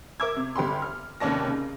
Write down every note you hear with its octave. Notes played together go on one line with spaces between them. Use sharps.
A#4 E5 D6 E6 G#6
C3
G1 G4 B5 C6
F6
F1 D#2 C#4 D5 A5 A#6
C#3